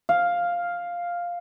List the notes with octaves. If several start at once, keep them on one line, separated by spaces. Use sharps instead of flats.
F5